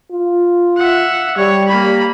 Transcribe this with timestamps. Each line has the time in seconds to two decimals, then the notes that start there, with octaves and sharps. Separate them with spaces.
0.12 F4
0.77 E5 F#5
1.37 G3 C#5
1.67 A#3 B5